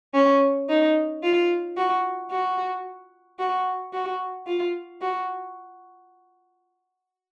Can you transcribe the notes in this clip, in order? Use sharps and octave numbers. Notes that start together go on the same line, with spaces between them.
C#4
D#4
F4
F#4
F#4
F#4
F#4
F4
F#4